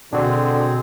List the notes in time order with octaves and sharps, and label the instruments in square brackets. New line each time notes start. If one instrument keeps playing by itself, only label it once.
[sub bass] B2 [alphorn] D3 [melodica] C4 G#4 [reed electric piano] D4 F#4 A4